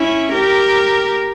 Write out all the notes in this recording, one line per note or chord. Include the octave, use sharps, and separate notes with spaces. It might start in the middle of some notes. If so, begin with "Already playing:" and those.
Already playing: C#4 E4
G4 A#4